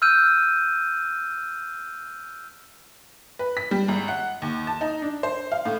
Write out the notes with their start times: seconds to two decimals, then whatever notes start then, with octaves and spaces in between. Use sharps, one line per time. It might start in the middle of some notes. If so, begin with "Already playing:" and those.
0.02 E6 F6 G6 D#7
3.39 B4
3.57 B6
3.71 G3
3.88 G#1
4.08 F#5
4.42 D#2
4.67 A5
4.81 D#4
5.02 D4
5.23 C5
5.52 F5
5.65 A2